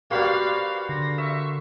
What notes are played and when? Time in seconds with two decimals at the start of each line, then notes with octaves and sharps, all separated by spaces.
0.11 A#3 F#4 G4 B4 C5 D5 F5
0.89 D3 A#6
1.18 E5 C#6